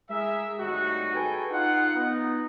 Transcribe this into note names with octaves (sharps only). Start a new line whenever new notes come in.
G#3 E4 G#4 A#4 E5
G#1 A2 G3 D#4 F#4
G#4 A4 B4 G5 G#5
D#4 F4 F#5
B3 D#4